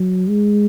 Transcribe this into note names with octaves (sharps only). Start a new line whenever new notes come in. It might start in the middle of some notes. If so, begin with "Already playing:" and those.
Already playing: F#3
G#3